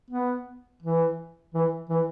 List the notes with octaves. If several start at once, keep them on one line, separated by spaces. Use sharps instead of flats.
B3
E3
E3
E3